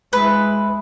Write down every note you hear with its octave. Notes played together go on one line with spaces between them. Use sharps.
G#3 E4 B4